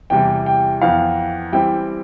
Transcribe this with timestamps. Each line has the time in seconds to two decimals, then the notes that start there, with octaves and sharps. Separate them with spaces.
0.10 E2 C3 E3 G3 G5
0.46 G5
0.81 F2 E3 B3 F5
1.53 E3 G3 C4 E4 G5